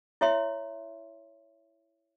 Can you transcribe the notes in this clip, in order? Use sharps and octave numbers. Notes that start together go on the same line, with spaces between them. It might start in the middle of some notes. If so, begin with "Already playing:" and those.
E4 C#5 E5 C6